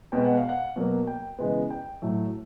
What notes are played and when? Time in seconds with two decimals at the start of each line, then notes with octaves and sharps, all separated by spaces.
0.12 B2 G#3 B3 G5
0.24 F#5
0.38 F5
0.49 F#5
0.76 B2 F#3 A#3
1.07 G5
1.39 C#3 E3 G#3 B3
1.70 G5
2.02 A2 F#3 A3